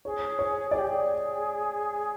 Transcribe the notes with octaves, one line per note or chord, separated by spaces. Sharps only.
G#4 C#5
C#5
G#4 D5
G4
G#4